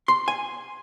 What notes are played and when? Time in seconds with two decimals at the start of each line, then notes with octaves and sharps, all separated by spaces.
0.08 C6
0.28 G#5